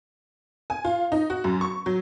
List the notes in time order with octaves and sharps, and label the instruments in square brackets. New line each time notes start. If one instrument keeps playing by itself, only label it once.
[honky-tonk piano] G#5
F4
D#4
F#4
F#2
C#6
F#3